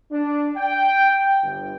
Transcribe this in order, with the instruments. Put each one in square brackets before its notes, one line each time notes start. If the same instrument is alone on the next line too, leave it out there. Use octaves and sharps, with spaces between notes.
[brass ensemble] D4
G5
G1